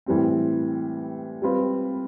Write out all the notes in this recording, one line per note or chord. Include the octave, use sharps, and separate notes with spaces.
A2 E3 G3 C4
G3 C4 F4 B4